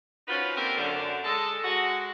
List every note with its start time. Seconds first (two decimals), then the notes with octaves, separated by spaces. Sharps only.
0.28 C#4 D#4 F4 F#4 B4 C5
0.56 A#3 C4 D4 G4 A4 A#4
0.77 F#2 D3
1.24 G#3 A4
1.63 G#3 F#4